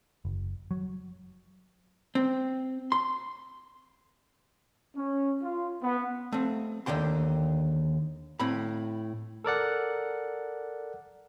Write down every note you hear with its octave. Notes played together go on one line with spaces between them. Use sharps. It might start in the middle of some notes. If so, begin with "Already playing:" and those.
F#1
F#3
C4
C6
C#4
F4
B3
A3 C4
D#2 G#2 D3 G5 C6
A2 C4 B5
A4 A#4 D5 F#5